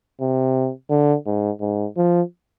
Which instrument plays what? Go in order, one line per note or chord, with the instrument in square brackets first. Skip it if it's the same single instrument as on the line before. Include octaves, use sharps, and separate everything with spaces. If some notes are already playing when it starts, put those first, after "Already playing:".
[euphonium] C3
D3
G#2
G#2
F3